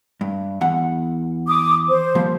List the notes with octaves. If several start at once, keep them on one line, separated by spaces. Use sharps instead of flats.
G2
E2 F#5
D6 D#6
C5
A#2 F3 G3